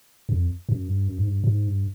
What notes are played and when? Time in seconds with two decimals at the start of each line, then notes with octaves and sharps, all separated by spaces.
0.29 F2
0.69 F#2
0.88 G2
1.08 F#2
1.18 G#2
1.27 G2
1.44 G2
1.47 G#2
1.67 G2